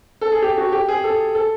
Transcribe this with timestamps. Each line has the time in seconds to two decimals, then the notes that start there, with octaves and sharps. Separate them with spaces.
0.21 A4
0.32 G#4
0.42 G4
0.58 F#4
0.72 G4
0.89 G#4
1.04 A4
1.35 A4